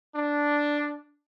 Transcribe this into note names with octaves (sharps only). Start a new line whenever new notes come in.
D4